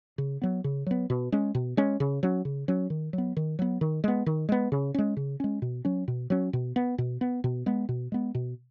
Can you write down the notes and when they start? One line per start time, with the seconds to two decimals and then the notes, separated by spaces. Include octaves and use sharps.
0.18 C#3
0.42 F#3 B3
0.64 C#3
0.86 F#3 B3
1.10 B2
1.32 G#3 C#4
1.55 B2
1.77 G#3 C#4
2.00 C#3
2.23 F#3 C#4
2.45 C#3
2.68 F#3 C#4
2.90 D#3
3.13 F#3
3.18 B3
3.37 D#3
3.59 F#3 B3
3.81 D#3
4.04 G#3 B3
4.26 D#3
4.49 G#3 B3
4.72 C#3
4.94 G#3 C#4
5.17 C#3
5.40 G#3 C#4
5.62 B2
5.85 F#3 C#4
6.08 B2
6.30 F#3 C#4
6.53 B2
6.76 B3
6.98 B2
7.21 B3
7.44 B2
7.66 G#3 B3
7.89 B2
8.12 G#3 B3
8.35 B2